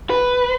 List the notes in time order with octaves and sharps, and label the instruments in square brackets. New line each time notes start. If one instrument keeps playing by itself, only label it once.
[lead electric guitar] B4